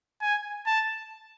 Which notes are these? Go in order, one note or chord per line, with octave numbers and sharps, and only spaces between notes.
G#5
A5